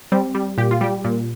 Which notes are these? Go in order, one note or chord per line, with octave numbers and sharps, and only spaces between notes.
G3 C4
G3
A#2 G4
F4
G3 G4
A#2